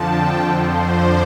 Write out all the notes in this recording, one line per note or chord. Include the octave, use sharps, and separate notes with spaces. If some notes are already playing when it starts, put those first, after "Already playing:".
Already playing: F2 D3 F3 G5 A5
F2 D3 F3 C5
D5